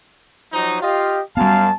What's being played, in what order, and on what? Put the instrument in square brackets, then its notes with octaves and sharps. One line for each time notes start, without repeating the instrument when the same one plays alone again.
[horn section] F3 F#3 D#4
[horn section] F4 D#5 F5 [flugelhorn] G4
[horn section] F#2 F5 [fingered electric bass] G3 B3 [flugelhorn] A5